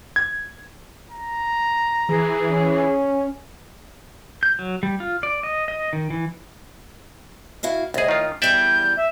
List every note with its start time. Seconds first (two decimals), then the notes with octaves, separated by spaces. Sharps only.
0.16 G#6
1.11 A#5
2.09 E3 G#4
2.51 C#4
4.43 G6
4.59 F#3
4.83 G3
5.00 F4
5.23 D5
5.43 D#5
5.68 D#5
5.93 D#3
6.10 E3
7.63 E4 F#4 F5
7.94 C2 A2 G#4 D#5
8.08 D#3 F4
8.42 E2 G3 A4 D5 E5 G5 G6
8.97 E5